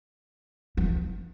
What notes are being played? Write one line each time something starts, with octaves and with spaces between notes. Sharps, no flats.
F3